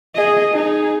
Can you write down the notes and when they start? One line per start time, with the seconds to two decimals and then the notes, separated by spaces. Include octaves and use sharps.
0.16 G#4 D#5
0.54 D#4 G#4